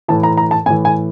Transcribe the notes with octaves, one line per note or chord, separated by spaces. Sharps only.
A2 E3 A5
A#5
A#5
A5
A2 E3 G#5
G#5